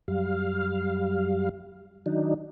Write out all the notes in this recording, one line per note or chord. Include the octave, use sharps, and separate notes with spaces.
F#2 G3 F5
D#3 F#3 D4 D#4